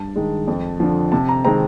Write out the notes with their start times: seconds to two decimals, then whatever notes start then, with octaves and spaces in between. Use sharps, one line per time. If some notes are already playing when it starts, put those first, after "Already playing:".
Already playing: G2 A5
0.16 D#3 G#3
0.47 F2
0.80 D3 F3
1.12 C3 A5
1.29 A#5
1.45 D#3 G#3 C4 A#5